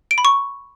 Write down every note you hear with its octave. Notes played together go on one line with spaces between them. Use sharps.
D7
B5
C#6